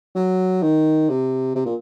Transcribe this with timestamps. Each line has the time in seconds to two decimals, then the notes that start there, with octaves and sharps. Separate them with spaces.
0.15 F#3
0.62 D#3
1.09 C3
1.55 C3
1.65 A#2